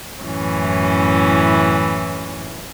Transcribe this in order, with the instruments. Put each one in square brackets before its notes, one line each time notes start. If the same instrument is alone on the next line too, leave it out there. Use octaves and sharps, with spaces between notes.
[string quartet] F#2 A2 E3 C#4